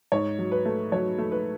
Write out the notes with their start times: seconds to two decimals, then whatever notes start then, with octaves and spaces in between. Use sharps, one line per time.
0.12 G#2 C#5
0.39 F#3
0.52 B4
0.65 A3
0.92 F#3 C#5
1.18 A3
1.32 B4